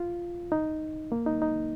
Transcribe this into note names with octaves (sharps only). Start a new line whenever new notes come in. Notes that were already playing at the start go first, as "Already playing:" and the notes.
Already playing: F4
D#4
A#3
D#4
D#4